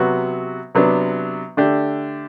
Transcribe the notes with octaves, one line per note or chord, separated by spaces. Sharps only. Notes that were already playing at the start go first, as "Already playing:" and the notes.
Already playing: C3 F#3 B3 F#4
C3 F#3 B3 D4
D3 A3 D4 G4